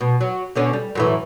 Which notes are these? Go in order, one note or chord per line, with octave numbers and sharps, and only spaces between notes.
B2
F#3
B2 D3 C#4
G3
F#2 A2 E3